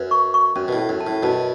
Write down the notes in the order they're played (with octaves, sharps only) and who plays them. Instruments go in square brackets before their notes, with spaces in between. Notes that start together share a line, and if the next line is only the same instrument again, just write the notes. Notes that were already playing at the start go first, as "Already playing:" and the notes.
Already playing: [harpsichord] F#2 [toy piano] B4
[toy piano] C#6
C#6
[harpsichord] F#2 [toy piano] C#4
[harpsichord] B2
A2
[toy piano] C#4
[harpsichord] F#2
[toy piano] A5
[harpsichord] A2
[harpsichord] F#2 B2 [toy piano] A5